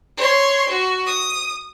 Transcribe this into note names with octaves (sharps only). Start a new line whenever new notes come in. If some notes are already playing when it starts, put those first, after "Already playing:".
C#5 C6
F#4
D#6